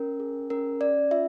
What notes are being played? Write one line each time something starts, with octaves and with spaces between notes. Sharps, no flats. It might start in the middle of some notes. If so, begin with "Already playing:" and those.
Already playing: C#4 A#4
G#4
C#4 A#4
C#4 D5
F4 E5